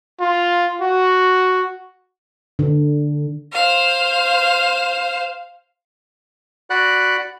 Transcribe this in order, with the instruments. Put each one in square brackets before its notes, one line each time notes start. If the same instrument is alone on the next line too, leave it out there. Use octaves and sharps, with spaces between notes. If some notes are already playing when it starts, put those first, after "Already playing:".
[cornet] F4
F#4
[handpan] D3
[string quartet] C5 F5
[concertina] F#4 D5 F#5 B5 F#6